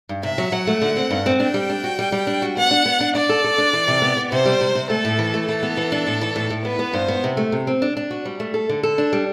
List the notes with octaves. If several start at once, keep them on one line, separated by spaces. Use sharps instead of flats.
G2
C3 E5
F#3
F#3 F#5
A3
D3
C4
G2
C4
D4 G5
G3
D4
F#4
G3
G3
D4
F#4
B3 F#5
D4
B3
D4
D4 D5
A4
A4
D4
E3
C3
B3
B3
C3 C5
G3
C3
C3
A3 A4
A2
E3
A3
E3 A4
B3
E3
D4
A2
E3
A2
A2
B3 B4
B3
G2 C5
B3
C3
A3
C3
C4
D4
D4
F#4
G3
A3
A4
D3
A4
D4
G3